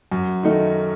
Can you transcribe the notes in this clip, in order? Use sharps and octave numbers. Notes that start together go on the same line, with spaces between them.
F#2
D#3 A3 D#4